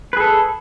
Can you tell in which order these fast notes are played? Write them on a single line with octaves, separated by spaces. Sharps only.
B4 G#4 A4